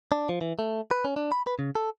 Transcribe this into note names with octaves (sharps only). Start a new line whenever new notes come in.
D4
F3
E3
A3
B4
C#4
D4
B5
B4
C#3
A4